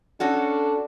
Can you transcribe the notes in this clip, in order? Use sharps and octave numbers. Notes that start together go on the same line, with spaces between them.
C#4 D4 F#4 A4